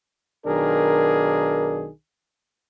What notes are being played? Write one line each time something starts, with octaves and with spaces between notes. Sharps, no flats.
B1 D#3 D4 G#4 A#4